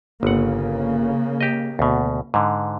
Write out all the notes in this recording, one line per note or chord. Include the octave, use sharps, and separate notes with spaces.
G1 C#3 A#3 F#5
G4 D#5
D2 B2
G#2 D3